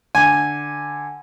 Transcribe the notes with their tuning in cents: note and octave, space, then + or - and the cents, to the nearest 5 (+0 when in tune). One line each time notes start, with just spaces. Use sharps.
D3 +0 G#5 -5